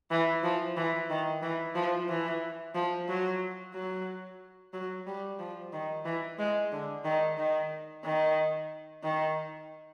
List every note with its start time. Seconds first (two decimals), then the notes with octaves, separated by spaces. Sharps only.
0.11 E3
0.43 F3
0.77 E3
1.10 D#3
1.42 E3
1.75 F3
2.09 E3
2.75 F3
3.09 F#3
3.74 F#3
4.73 F#3
5.07 G3
5.39 F3
5.73 D#3
6.05 E3
6.39 G#3
6.73 D3
7.04 D#3
7.38 D#3
8.04 D#3
9.04 D#3